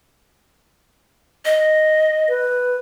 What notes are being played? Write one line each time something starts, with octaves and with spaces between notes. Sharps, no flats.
D#5
B4